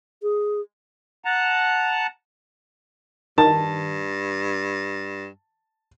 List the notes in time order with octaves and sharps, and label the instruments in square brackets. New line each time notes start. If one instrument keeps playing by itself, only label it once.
[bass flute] G#4
[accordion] F#5 A5 A#5
[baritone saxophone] G2 [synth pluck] D#3 [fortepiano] A5